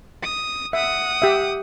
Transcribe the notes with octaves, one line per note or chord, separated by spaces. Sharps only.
D#6
E5 F#5 D#6
G4 E5